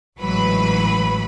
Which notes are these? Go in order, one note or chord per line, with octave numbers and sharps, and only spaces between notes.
A1 G#2 E3 F#3 B4 B5